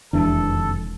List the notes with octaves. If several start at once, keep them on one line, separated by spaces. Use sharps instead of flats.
E1 F2 C3 D#3 E3 D4 A4